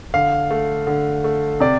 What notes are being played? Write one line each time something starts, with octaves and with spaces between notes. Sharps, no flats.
D3 F5
A3
D3
A3
C3 D5